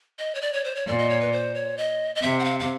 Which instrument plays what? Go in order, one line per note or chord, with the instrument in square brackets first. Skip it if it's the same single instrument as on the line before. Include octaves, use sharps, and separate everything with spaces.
[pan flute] D#5
C#5
D5
C#5
C5
C#5
[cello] A#2 [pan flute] D5
[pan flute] D#5
C#5
B4
C5
C#5
D#5
D#5
[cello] C3 [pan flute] E5
[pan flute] F#5
F5
F5